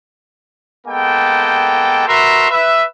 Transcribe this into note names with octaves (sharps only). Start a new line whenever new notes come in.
G#3 A#3 B3 A4 G5
F#4 A#4 B4 E5 A#5 C6
B4 E5